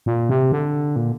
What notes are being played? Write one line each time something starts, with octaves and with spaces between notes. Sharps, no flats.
A#2
C3
D3
A#2